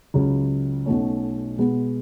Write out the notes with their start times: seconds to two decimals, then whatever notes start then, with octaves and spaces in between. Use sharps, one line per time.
0.14 C#2 C#3 F#3
0.86 B1 B2 A3 C#4
1.58 B2 G#3 B3